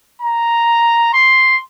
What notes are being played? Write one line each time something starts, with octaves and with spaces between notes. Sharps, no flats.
A#5
C6